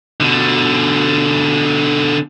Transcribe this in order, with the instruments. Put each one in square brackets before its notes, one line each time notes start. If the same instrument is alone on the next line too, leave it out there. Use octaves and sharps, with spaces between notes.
[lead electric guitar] B2 D3